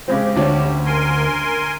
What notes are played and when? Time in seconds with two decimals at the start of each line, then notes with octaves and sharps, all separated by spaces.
0.08 C#3 G#3 C4 G4
0.36 D2 C#4 D4
0.85 A#4 G#5 C6